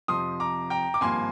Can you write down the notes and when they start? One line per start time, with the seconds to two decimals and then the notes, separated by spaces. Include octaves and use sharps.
0.08 F2 C3 F3 C6 D#6
0.40 A#5 D6
0.70 G5 A#5
0.94 D6
1.01 G#1 G2 F3 A#3 G#5 C6